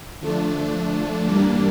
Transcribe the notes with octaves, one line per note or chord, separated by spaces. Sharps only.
D3 F3 A3 D4
G2 E3 G3 A#3 D4